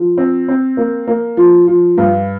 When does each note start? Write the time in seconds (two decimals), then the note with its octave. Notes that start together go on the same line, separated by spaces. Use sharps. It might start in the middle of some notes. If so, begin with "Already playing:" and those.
Already playing: F3
0.18 C4
0.48 C4
0.77 A#3
1.08 A#3
1.37 F3
1.67 F3
1.98 G2